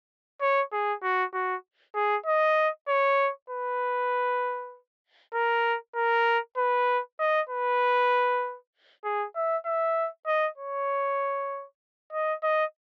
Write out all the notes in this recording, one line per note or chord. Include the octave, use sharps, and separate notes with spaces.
C#5
G#4
F#4
F#4
G#4
D#5
C#5
B4
A#4
A#4
B4
D#5
B4
G#4
E5
E5
D#5
C#5
D#5
D#5